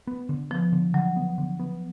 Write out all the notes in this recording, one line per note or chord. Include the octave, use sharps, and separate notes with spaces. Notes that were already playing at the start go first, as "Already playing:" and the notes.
B3
D3
F3 B3
D3
D3 F#3
B3
D3
B3